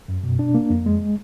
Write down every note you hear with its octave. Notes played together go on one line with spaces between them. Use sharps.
F#2
B2
D4
A#3
F2
G#3